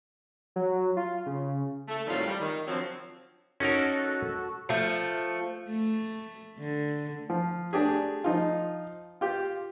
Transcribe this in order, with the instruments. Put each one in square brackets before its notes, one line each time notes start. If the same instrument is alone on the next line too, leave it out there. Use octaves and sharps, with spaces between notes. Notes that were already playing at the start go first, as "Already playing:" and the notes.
[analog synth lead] F#3
F4
C#3
[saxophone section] A3
A2 D#3 F#3 G3 C4 F4
G3
D#3
D3 F3 F#3 C4
[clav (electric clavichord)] C#4 D#4 A#4 [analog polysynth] F#4 A4
[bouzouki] F3 A3
[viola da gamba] A3
D3
[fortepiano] F3
A3 D4 G4 G#4
F3 D#4 F4
F4 G4